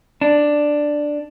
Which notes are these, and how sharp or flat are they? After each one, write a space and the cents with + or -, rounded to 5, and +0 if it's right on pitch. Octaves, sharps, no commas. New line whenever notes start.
D4 +5